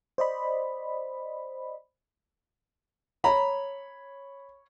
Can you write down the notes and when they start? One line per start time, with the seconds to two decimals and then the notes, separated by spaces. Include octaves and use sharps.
0.18 C5 D5 D#5 B5
3.24 C#5 A#5 B5